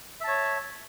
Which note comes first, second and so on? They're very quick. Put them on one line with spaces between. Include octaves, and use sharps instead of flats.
E5 A5 C#5